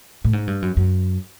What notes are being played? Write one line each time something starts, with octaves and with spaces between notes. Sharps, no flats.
A2
G#2
G2
F#2
F#2